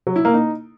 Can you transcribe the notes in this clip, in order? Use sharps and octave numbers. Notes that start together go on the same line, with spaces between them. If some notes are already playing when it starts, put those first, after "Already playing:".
F#3
E4
A#3
D#4